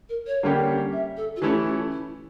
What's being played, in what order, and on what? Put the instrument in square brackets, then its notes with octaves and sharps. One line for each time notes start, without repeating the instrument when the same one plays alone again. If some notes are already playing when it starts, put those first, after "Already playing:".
[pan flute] A#4
C#5
[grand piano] D3 G3 A#3 C#4 G4
[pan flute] E5
A4
F4
[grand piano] E3 A3 C#4 E4 A4 [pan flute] G4
[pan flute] F4
E4